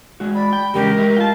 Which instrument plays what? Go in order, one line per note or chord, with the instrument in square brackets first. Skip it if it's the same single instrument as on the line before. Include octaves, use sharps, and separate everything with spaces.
[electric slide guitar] G#3 F#4
[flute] D5 [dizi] B5
[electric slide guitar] G5
[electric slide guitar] E2 C#3 G3 [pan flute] G#3 [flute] G4 [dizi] A#4
[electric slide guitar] A3 G4 [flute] E5
[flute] F4 [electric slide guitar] G5 A5